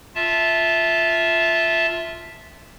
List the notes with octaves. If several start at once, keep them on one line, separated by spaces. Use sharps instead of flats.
F4 E5 A5